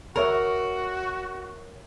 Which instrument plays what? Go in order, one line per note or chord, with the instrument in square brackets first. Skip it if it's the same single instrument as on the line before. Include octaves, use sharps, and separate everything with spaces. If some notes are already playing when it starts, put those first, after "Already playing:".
[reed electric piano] D2 C#5 E5 [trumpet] F#4 [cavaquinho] A#4